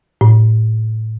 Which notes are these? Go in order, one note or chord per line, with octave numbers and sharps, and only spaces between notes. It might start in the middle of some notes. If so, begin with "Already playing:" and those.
A2